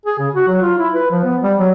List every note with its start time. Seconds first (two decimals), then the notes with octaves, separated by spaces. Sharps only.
0.06 G#4
0.19 C#3
0.34 F#4
0.48 F#3
0.62 F4
0.78 E4
0.94 B4
1.11 F3
1.24 B3
1.43 G3
1.59 F#3